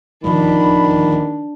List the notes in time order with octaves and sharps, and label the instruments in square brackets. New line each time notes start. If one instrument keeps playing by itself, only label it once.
[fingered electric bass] D1 D#2 F3 [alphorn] D#3 [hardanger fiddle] D4 [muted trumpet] B5